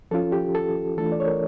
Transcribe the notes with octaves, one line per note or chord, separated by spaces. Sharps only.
F3 C#4 F4 A4
G4
A4
E3 A3 D4 F4 A4
D5
C#5
A#4